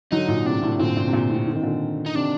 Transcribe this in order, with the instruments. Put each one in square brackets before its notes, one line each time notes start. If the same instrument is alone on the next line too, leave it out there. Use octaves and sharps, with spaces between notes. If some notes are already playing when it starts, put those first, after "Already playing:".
[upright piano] D3 F#3 [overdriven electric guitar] D#4
[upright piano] A#2 D3
[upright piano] A2 C3 [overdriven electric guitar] D4
[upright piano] A2 C3
[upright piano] A#2 D3 [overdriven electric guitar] C4
[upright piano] A#2
C3
A#2
A2 C3
D3
D#3
A#2 D3
[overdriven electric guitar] D#4
[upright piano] C3 D#3 [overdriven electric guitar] D4